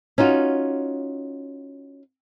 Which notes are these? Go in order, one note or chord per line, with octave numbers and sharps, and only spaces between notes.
C#4 D#4 F4 F#4